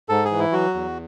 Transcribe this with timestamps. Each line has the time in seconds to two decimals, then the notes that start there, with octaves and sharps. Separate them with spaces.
0.09 G#2 A4
0.25 G#4
0.31 E3
0.39 E4
0.52 F#3 F#4
0.74 E2